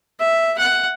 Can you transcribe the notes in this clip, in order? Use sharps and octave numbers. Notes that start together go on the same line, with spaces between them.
E5
F#5